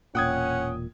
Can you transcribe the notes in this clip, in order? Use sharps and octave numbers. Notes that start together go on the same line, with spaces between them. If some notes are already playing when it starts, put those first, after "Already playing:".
E1 A#2 C#4 F#5 G5 D#6 G#6